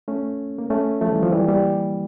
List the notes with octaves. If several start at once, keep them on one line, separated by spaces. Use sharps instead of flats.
A3 C#4
A#3
A3 C#4
F3 A3
E3 G3
F3
E3 G3
G3 A#3